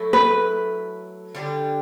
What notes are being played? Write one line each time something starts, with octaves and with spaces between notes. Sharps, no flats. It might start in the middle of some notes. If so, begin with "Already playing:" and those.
Already playing: F#3 A3 E4 A4
B4
D3 G3 D4 G4